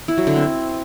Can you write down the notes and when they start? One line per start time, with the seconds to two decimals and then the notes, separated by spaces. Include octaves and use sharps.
0.08 E4
0.18 F#3
0.27 D3
0.36 C4